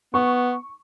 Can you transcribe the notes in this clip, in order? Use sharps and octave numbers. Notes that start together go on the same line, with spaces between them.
B3 C#6